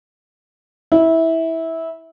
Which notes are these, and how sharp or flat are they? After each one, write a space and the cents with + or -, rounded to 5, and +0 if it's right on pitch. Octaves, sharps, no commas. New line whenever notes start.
E4 -15